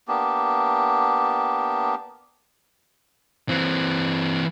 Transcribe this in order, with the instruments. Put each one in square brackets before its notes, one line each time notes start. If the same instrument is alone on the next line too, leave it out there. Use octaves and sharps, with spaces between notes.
[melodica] A#3 B3 D4 G4
[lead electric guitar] E3 C4